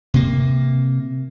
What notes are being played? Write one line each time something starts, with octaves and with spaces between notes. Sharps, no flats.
C3 A#3